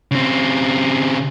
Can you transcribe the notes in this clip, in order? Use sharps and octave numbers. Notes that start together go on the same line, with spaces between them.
C#3 C4